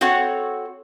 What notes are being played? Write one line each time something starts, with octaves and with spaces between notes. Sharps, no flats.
C4 F#4 A4 C#5 F#5